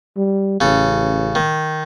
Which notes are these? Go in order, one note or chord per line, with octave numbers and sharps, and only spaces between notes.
G3
A1 C#3 A4
D#3